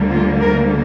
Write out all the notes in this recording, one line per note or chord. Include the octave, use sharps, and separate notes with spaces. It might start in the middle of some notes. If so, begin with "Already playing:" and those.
Already playing: D2 D3 G3 A#3
F4
A#4